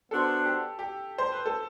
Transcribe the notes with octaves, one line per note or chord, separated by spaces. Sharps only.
B3 D4 F#4 A4 C5
G4
G4
C5
B4
A4